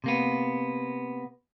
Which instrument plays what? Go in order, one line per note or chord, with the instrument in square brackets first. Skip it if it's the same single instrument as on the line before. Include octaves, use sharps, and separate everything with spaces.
[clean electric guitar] C3 A#3 B3